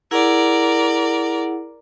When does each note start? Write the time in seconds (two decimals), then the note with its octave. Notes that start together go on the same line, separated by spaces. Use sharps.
0.11 E4 G#4 A#4 D5 F#5